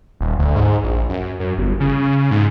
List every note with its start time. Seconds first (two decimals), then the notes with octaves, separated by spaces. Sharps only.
0.20 D#1
0.39 D2
0.56 G#2
0.84 A#1
1.09 F#2
1.40 F#2
1.58 G1
1.80 C#3
2.31 G#2